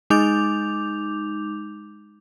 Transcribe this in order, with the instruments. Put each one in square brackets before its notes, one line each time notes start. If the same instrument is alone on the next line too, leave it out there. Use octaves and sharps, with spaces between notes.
[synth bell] G#3 D#4 D6 G6 F7